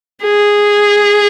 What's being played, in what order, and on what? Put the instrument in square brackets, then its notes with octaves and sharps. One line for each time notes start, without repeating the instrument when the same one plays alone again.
[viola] G#4